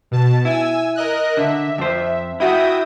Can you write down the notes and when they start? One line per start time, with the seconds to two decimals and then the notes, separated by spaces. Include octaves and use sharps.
0.11 B2 A5
0.45 E4 G#5 E6
0.95 A#4 D#5 F#6
1.37 D3 E5
1.78 F2 C5
2.40 E4 F#4 E5 G5 D#6